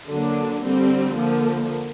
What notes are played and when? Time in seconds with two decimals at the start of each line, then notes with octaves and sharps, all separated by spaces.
0.08 D3 F#3 A#3 D4
0.62 D3 G3 C4
1.15 D3 F3 A#3